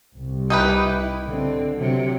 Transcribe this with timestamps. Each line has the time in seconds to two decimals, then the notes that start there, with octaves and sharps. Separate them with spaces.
0.16 C2
0.50 D#4 E4 G4 B4
1.29 D3 C4
1.77 C3 F#3